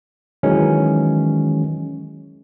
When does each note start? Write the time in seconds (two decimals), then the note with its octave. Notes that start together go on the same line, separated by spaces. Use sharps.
0.43 D#3 E3 F#3 G#3 C#4